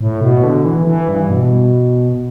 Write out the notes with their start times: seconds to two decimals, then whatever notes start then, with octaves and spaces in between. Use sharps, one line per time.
0.01 A2
0.21 B2
0.44 D3
0.65 E3
0.87 E3
1.09 G2
1.30 B2